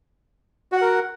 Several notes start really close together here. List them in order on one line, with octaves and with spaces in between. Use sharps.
F#4 F#5 A#4